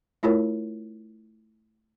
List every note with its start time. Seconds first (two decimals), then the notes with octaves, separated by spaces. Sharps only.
0.23 A3 E4 F4 G#4 A#4 C#5